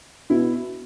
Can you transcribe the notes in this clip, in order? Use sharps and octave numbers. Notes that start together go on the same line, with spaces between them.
B2 E4